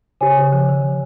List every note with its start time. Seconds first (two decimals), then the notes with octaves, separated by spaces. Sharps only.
0.21 C#3 G4 C#5 G#5
0.37 C#3
0.52 F3
0.69 D#3